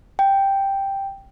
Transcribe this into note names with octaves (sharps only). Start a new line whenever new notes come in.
G5